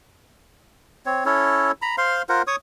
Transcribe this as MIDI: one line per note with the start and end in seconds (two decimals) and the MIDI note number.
1.06 1.25 60
1.06 1.25 73
1.25 1.72 61
1.25 1.72 64
1.25 1.72 69
1.25 1.72 73
1.82 1.96 82
1.82 1.96 83
1.98 2.22 72
1.98 2.22 77
1.98 2.22 84
2.29 2.42 65
2.29 2.42 70
2.29 2.42 72
2.29 2.42 78
2.47 2.56 73
2.47 2.56 85
2.47 2.56 87